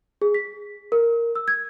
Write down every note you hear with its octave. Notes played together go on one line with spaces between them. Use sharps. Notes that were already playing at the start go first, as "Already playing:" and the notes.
G#4
B6
A#4
E6
G#6